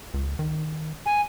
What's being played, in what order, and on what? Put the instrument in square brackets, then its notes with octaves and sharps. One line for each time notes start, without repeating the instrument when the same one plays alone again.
[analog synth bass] C#2
D#3
[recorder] G#5